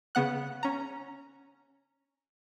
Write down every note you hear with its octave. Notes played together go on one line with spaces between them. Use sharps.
C#3 B3 F#5 F#6
C#4 A#5